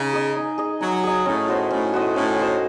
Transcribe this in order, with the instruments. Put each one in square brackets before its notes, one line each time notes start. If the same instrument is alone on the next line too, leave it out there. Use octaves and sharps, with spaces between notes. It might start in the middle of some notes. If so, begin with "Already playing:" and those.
Already playing: [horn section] C#3 [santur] D#4
[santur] G#4 D#5
D#4
G#4 D#5
[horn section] F#3 [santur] D#4
[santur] G#4 D#5
[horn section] A2 [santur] C#4
[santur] F#4 C5 D#5
[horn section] A2 [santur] C#4
[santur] F#4 C5 D#5
[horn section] A2 [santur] C#4
[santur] F#4 C5 D#5